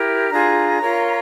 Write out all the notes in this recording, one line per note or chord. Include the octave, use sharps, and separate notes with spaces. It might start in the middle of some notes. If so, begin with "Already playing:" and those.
Already playing: E4 G4 A#4
D4 F4 G#4 A#5
F4 A#4 C#5